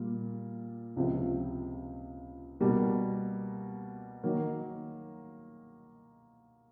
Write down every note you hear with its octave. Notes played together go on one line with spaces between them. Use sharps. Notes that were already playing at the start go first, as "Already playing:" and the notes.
Already playing: A#2 G3
C#2 C3 F3
B2 G3 A#3
D#3 F#3 A#3